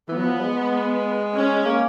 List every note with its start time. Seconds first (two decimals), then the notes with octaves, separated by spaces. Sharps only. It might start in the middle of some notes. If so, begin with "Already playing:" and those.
0.09 E3 B3
0.17 F#3
0.25 F3
0.40 G#3
1.34 C#4
1.66 A#3